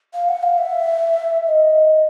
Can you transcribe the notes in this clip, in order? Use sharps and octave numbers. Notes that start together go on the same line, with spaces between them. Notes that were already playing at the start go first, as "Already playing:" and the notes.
F5
F#5
F5
E5
D#5